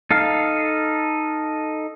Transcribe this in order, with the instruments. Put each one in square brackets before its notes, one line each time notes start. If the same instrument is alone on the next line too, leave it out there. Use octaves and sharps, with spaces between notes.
[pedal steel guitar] D#4 A4 F5